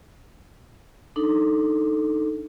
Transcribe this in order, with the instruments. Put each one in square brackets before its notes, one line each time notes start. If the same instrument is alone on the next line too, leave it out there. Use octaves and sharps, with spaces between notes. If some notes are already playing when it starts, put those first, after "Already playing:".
[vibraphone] D4 D#4 A4